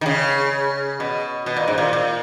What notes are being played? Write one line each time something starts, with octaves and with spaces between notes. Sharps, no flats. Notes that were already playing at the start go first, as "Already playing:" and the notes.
D#3
C#3
B2
B2
A#2
G#2
A#2
A#2